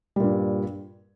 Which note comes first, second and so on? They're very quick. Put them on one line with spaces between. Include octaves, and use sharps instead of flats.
G3 A#2 G2